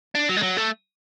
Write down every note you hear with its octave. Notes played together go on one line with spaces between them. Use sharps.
D4
F#3
G#3
F#3
A3